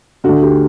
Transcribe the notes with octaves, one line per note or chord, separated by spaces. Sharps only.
D2 D3 F#4
G4